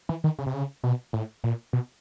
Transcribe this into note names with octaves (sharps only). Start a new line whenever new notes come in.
E3
D#3
C#3
C3
C#3
B2
A2
A#2
B2